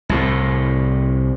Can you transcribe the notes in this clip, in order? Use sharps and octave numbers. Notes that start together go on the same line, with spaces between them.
C2 A2